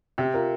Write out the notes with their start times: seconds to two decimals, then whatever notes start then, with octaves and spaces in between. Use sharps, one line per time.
0.18 C3 G4
0.34 F4 A#4